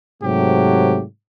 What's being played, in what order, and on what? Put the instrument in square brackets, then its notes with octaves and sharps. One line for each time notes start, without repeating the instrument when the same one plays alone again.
[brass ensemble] G#2 C3 F#3 A3 G4